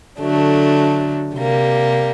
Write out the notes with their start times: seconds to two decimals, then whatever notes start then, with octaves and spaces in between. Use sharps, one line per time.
0.19 D3 F#3 A3 D4
1.35 C3 G3 A#3